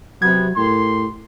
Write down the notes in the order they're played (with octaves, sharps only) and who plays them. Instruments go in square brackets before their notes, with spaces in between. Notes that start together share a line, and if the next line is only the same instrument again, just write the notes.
[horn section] C3 B3 [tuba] F#3 [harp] G#6
[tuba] A2 [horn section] G4 A#4 C6